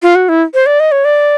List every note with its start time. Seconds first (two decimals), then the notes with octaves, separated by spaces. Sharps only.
0.02 F4
0.15 F#4
0.29 E4
0.54 C5
0.66 D5
0.80 D#5
0.92 C#5
1.05 D5